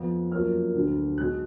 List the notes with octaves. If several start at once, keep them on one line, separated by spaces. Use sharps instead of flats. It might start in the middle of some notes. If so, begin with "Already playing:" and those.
Already playing: F2 F3 B3
F#2 F3 A#3 F6
D2 D3 F#3
B1 B2 G#3 F#6